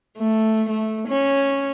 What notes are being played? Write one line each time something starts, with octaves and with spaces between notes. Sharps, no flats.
A3
A3
C#4